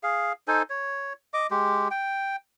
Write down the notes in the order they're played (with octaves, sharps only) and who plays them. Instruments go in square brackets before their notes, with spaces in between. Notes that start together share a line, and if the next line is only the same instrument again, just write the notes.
[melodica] G#4 F5
D#4 A4 C5 G#5
C#5
D#5 D6
G#3 G4
G5